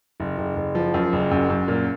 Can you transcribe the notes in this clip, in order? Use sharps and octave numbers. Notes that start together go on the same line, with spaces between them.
F#1
F#1
F#1
F3
F#2
F#1
F#2
F#2
A#2